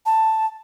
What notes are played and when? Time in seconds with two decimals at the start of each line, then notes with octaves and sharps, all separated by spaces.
0.06 A5